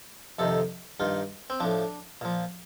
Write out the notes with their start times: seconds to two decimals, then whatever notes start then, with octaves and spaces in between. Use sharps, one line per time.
0.39 F2 C3 D#3 A4
1.00 G2 D#3 F4
1.50 C4
1.60 A2 F3 D4
2.21 A#2 F3